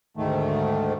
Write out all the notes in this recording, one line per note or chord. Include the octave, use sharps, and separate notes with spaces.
D2 G#2 D#3 A3